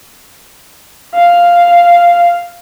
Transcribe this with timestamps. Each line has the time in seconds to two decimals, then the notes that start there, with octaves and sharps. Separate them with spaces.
1.15 F5